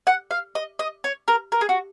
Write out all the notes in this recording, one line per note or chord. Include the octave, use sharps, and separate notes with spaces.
F#5
F5
D#5
D#5
C#5
A#4
A#4
G#4
F#4